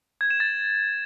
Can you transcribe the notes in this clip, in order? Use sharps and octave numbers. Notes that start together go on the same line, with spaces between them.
G#6
E7
A6